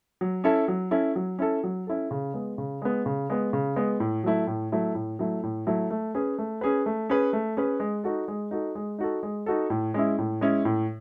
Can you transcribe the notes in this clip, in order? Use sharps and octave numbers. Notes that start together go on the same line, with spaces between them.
F#3
C#4 E4 A4
F#3
C#4 E4 A4
F#3
C#4 E4 A4
F#3
C#4 E4 A4
C#3
G#3 B3
C#3
G#3 B3
C#3
G#3 B3
C#3
G#3 B3
A2
F#3 A3 E4
A2
F#3 A3 E4
A2
F#3 A3 E4
A2
F#3 A3 E4
A3
C#4 G#4 B4
A3
C#4 G#4 B4
A3
C#4 G#4 B4
A3
C#4 G#4 B4
G#3
D#4 F#4 A4
G#3
D#4 F#4 A4
G#3
D#4 F#4 A4
G#3
D#4 F#4 A4
A2
G#3 C#4 E4
A2
G#3 C#4 E4
A2